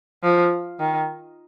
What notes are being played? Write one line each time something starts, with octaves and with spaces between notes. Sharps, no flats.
F3
D#3